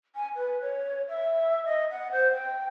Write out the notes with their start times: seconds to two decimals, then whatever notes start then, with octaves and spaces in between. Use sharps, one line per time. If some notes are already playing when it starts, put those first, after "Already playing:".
0.15 G#5
0.36 B4
0.61 C#5
1.08 E5
1.65 D#5
1.91 F#5
2.12 C5
2.32 G5